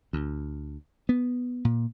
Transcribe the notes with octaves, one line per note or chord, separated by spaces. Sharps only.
D2
B3
A#2